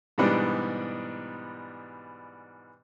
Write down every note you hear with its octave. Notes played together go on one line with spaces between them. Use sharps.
G#2 B2 E3 G3 B3 D4